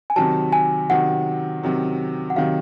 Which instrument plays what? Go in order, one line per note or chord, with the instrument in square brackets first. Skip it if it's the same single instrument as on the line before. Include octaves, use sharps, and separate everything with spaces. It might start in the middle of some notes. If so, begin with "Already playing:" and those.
[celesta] G#5
[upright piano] C3 D#3 F#3 [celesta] A5
[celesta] G#5
[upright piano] C3 D#3 F#3 [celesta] F#5
[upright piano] C3 D#3 F#3
[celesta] F#5
[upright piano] C3 D#3 F#3 [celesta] F5